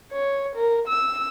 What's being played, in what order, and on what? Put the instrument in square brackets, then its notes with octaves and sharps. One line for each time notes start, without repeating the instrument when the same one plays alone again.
[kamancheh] C#5
A#4
E6